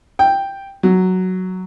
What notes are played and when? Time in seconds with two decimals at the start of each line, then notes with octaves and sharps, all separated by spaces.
0.19 G5
0.83 F#3